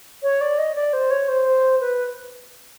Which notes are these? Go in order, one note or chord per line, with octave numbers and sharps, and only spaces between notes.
C#5
D5
D#5
D5
C5
C#5
C5
B4